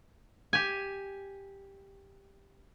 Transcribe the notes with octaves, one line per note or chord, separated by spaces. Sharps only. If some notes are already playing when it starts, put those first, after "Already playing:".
G4 G#5